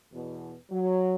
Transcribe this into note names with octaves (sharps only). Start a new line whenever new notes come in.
E2 B2
F#3